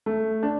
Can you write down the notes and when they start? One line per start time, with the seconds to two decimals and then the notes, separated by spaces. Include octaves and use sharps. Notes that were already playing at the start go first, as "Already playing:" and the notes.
0.06 A3
0.43 D4